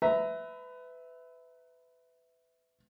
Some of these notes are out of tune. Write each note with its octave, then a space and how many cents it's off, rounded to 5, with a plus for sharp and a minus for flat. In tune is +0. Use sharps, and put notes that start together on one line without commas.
B4 +25 E5 -10 A#5 +0